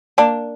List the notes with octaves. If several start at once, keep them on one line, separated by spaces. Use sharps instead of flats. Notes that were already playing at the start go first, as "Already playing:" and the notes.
A#3 D4